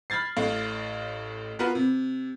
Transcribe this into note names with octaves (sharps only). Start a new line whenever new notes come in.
B5 F6 G#6 A6 C7
A1 A2 F5
B3 F4 F#4 A#4 B4
C3